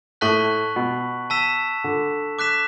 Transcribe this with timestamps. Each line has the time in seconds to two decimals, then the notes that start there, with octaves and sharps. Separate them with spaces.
0.21 A2 A5 C#6 F#6 B6 F#7
0.76 B2
1.30 A5 E6 B6 E7
1.84 D3
2.39 D6 F#6 B6 E7